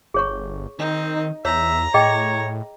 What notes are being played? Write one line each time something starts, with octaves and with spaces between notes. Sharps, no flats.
G1 G#4 C#5 C#6
D#3 C4 D#4
E2 C#5 E5 A#5
A2 G#4 C#5 D#5 G5